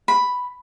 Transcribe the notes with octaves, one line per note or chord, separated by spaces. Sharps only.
B5